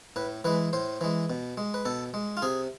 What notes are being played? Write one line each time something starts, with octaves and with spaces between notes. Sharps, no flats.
A2 B4
E3 G#3 B4
A2 C5
E3 G#3
B2
G#3
B4
B2 A4
G#3
F4
C3 G#4